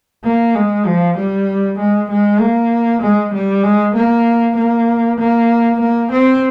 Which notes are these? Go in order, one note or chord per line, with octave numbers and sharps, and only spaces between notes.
A#3
G#3
F3
G3
G#3
G#3
A#3
G#3
G3
G#3
A#3
A#3
A#3
A#3
C4